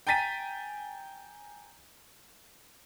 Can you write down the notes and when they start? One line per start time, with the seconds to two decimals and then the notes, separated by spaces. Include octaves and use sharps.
0.07 G5 G#5 A#5 A6 B6 D#7